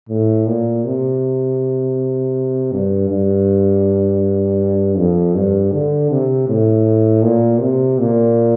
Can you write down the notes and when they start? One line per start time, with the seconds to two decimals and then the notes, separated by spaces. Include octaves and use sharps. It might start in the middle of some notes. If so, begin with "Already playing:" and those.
0.09 A2
0.47 A#2
0.85 C3
2.72 G2
3.10 G2
4.97 F2
5.35 G2
5.73 D3
6.10 C3
6.48 A2
7.23 A#2
7.60 C3
7.99 A#2